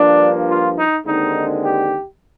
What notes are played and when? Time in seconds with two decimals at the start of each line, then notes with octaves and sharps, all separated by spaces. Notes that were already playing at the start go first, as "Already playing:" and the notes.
Already playing: G2 F3 A#3 D4
0.48 F4
0.77 D#4
1.05 D#2 D3 G#3 C4 D#4
1.63 G4